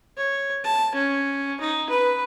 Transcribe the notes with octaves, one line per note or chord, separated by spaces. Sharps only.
C#5
A5
C#4
D#4
B4